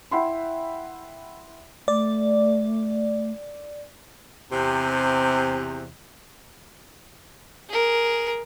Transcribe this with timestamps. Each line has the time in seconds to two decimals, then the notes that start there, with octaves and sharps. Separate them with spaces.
0.11 E4 E5 F#5 G5 B5 C6
1.88 A3 D5
4.52 E2 C3
7.69 G#4 A#4